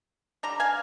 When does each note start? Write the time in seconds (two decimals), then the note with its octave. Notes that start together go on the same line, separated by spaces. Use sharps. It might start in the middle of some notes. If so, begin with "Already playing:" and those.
0.43 D3 G3 A#5
0.60 F5 G#5